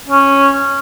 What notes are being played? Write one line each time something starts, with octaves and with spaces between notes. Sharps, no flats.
C#4